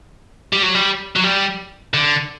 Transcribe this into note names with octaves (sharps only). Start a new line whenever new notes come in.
G3
F#3
G3
F#3
G3
D3